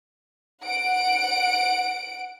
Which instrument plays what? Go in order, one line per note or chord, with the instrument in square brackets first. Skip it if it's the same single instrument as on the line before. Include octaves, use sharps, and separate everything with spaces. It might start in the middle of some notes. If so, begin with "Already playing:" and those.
[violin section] F#5 D7